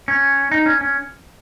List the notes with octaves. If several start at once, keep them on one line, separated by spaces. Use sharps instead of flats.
C#4
D#4
C#4
C#4